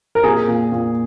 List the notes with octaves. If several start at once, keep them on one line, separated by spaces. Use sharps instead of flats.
A#4
A#2 G#4
A#2
A#2